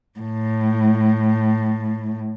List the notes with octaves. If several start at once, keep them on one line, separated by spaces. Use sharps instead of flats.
A2